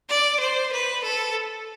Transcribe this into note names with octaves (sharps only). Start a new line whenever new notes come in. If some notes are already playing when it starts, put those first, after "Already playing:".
D5
C5
B4
A4